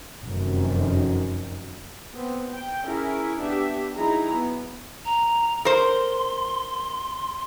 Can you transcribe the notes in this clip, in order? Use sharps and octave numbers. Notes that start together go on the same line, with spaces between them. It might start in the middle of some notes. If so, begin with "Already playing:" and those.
F1 F#2 D#3
B3 C4
G5
C#4 E4 G#4 A#4
B3 D4 G4 E5
F#3 D#4 E4 G#4 A#5
B3
A#5
A#4 C5 C6